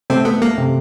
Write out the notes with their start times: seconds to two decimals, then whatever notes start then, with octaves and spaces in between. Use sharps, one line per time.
0.10 C3 A3 C4
0.25 A3 B3
0.41 A3 A#3
0.58 C3